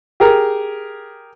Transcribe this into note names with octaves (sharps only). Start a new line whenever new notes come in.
G4 G#4 A#4